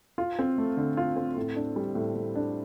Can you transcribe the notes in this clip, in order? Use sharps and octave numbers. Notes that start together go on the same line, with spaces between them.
F4
C4
A3
D3
F4
C4
A2
D4
G3
A2
A2
D4